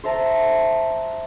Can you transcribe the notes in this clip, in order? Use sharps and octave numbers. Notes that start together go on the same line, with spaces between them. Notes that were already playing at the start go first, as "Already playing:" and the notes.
C5 E5 A5 A#5